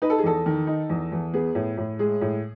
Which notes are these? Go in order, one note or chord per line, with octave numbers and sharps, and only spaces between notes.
D#4 B4
A4
G#4
E2 A4
D#3
D#4
E2
E2
B3 G#4
A2
A2
G#3 G#4
A2